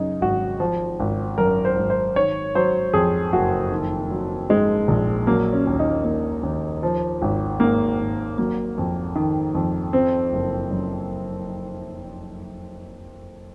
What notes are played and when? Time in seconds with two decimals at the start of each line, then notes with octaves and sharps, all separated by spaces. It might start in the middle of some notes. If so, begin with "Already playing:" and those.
Already playing: F#2 C#3 C#4 D#4
0.21 G#1 F#4
0.60 F3
1.00 G#1
1.38 F#2 A#4
1.65 C5
1.77 G#1
1.90 C5
2.16 D#3 C#5
2.55 F#3 C5
2.93 F2 G#4
3.33 F#1 F#4
3.72 D#3
4.11 F#3
4.49 G#2 G#3
4.88 A#1
5.27 F#3 A#3
5.53 C#4
5.67 D#2
5.79 D#4
6.04 D#3 A#3
6.43 D#2
6.83 F3
7.22 G#1
7.60 G#2 A#3
7.99 G#1
8.38 F#3 A#3
8.78 F2
9.16 D#3
9.55 F2
9.93 F3 C4
10.33 F#1
10.71 F#2